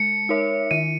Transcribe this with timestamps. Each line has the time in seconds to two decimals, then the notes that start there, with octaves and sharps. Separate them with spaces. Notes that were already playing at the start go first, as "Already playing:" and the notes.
Already playing: G#3 C#7
0.29 D#4 A#4 C#5 E5
0.71 D#3 D#7